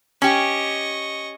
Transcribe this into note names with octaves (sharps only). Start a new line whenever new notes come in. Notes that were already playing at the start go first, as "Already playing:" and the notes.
C#4 G4 D#5 C#6